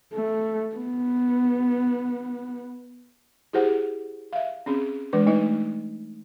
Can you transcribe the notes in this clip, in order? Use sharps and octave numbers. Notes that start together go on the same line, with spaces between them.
A3
B3
E4 G4 G#4 C5 F#5
E5 F5
C4 C#4 G#4
E3 G#3 D4 B4
A3 D#4 D#5